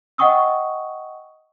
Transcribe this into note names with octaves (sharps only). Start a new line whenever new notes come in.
D#5 F#5 G5 C#6 D#6 E6